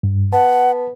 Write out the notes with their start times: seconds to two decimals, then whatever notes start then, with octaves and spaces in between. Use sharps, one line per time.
0.03 G2
0.33 B3 F#5 A5